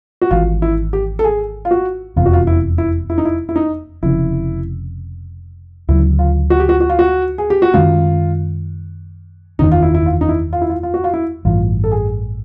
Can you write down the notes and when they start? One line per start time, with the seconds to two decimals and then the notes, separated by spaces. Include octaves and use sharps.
0.22 F#4
0.31 G#1 G#2 E3 F4
0.62 E4
0.93 G4
1.19 A4
1.24 G#4
1.65 F4
1.71 F#4
2.16 F1 E2 C3 F4
2.26 F#4
2.33 F4
2.47 E4
2.78 E4
3.10 E4
3.18 D#4
3.25 E4
3.49 E4
3.56 D#4
4.03 F1 F2 C#3 E4
5.89 D2 C#3 F#3 E4
6.19 F4
6.50 F#4
6.60 G4
6.69 F#4
6.80 F#4
6.89 F4
6.99 F#4
7.38 G#4
7.50 G4
7.62 F#4
7.74 F#2 D#3 G#3 C#4 F4
9.59 F#1 E2 C3 D#3 D#4
9.72 F4
9.82 E4
9.94 E4
10.06 F4
10.21 D#4
10.29 E4
10.53 F4
10.61 E4
10.70 F4
10.83 F4
10.94 F#4
11.04 F4
11.14 E4
11.45 A1 G2 E3 F4
11.84 A4
11.92 G#4